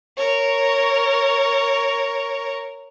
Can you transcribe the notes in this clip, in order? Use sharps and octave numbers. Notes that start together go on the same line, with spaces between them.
A#4 C#5